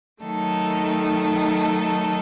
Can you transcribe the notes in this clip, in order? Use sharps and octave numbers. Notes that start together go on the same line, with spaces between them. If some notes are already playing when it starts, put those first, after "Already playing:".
D#3 F#3 A3 D#4 A4